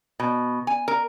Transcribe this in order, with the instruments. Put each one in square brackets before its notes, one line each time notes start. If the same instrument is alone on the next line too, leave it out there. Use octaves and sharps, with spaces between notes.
[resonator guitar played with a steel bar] B2
G#5
A#4